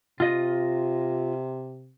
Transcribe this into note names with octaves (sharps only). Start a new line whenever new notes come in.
C3 F4 D#5